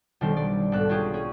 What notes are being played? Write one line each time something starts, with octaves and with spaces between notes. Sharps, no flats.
B1 D#3 G3 D4 C5
D5
G#1 B3 A4 F#6
C#4 D4 F4 G4 G#4
C#4 G#4